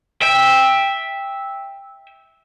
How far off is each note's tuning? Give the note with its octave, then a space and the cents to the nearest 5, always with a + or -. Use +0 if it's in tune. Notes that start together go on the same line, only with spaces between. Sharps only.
E5 -10 G5 +15